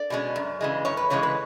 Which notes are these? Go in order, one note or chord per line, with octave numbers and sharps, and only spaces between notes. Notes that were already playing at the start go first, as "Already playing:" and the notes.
Already playing: D5
B2 G#3 C#4
F#2
C#3 E3 G#3
F#2 C#5
B4
C#3 E3 G#3 C#5
B4